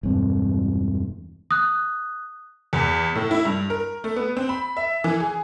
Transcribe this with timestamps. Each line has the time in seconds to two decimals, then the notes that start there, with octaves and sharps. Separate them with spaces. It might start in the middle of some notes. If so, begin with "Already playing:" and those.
0.03 E1 G2 C4
1.51 D#6 F#6
2.73 E2
3.15 A2
3.31 E4
3.45 G2
3.70 A#4
4.04 A3
4.16 B3
4.37 C4
4.49 B5
4.77 E5
5.04 E3
5.20 G#4